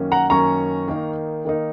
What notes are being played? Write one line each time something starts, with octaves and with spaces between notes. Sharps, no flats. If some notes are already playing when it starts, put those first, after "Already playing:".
Already playing: F#2 D#3 A#3 C#4
F#5 A#5
F#2 D#3 A#3 C#4 A#5 C#6
D#3 A#3 D#4
D#3 A#3 D#4